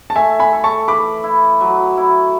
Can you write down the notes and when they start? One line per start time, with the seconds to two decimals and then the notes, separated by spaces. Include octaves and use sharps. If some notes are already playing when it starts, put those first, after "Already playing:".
0.10 A5
0.16 A3 E5 G#5
0.40 G#5 B5
0.52 A4
0.64 A5 C#6
0.88 E3 B5 D6
1.24 E4
1.61 F#3
1.97 E4